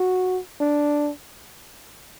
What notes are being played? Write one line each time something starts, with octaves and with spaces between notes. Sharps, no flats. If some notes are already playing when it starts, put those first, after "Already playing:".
Already playing: F#4
D4